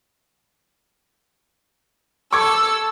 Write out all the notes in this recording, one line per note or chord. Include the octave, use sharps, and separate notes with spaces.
A4 C#6 D6 E6 G#6